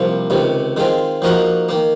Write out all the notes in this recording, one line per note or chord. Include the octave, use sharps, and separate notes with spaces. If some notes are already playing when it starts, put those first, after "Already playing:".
Already playing: C2 C3 F3 A#3
C#2 C3 D#3
D#3 G#3 C4 F4
F3 A#3 D#4 F#4 A#4
D#3 A#3